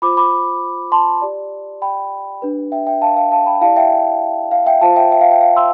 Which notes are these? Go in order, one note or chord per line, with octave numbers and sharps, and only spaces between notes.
F4 C5 B5 D6
B5 D6
A5 C6
G4 D5
G5 B5
D4 G4 B4
E5 G5
E5 G5
F5 A5
F5 A5
F5 A5
G5 B5
E4 G4 D5 F5 A5
E5 G5
F5
E5 G5
F4 C5 F5 A5
E5 G5
E5 G5
F5
E5 G5
F5
C6 E6